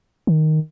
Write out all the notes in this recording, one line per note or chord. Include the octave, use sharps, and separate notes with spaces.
D#3